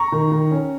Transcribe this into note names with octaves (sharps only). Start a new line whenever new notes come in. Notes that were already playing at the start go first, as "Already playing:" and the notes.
Already playing: A#5 C#6
D#3
D#3
C#4